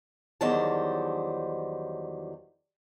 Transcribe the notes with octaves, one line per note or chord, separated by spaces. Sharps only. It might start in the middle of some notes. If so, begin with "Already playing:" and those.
E2 D#3 F#3 G3 C5 A5